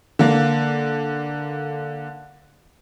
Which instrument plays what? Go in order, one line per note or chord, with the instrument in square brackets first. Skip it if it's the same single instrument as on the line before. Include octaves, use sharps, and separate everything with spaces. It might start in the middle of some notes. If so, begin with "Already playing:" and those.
[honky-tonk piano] D3 A#3